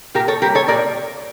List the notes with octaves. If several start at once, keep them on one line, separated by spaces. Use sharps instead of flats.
A#2 G4 A#4
A4 C#5
G3 A#3 G4 A#4
A4 C#5
A#2 A#4 D5